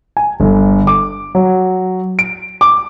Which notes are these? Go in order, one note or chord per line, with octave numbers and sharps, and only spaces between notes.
G#5
G1
D6
F#3
D7
D6